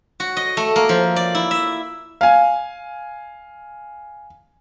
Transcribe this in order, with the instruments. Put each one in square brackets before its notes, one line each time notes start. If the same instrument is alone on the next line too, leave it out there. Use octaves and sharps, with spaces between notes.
[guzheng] F#4
D#5
A3
A#3
F3
D5
E4
E5
[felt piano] F5 G#5